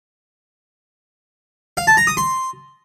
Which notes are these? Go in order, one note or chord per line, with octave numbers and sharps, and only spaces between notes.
F5
A5
A#5
D#6
C6